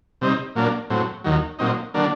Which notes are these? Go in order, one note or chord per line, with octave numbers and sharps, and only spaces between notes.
C3 G3 C4 D#4
A#2 F#3 A#3 D4
A2 F#3 C4
D#2 D#3 F#3
A#2 F#3 C4 D#4
D3 F#3 A#3 D4